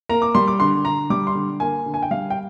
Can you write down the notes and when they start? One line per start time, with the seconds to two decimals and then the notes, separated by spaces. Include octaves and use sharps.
0.09 A#3 A#5
0.22 D6
0.35 G3 C6
0.48 D6
0.60 D3 C6
0.85 D3 A#5
1.10 G3 D6
1.27 C6
1.35 D3
1.60 A#3 G#5
1.86 D3
1.94 G#5
2.02 G5
2.11 G3 F5
2.30 G5